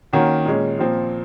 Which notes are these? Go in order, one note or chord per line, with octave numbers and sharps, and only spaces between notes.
D#3 A#3 C#4 F#4
A#2 G#3 C#4
A#2 F3 C4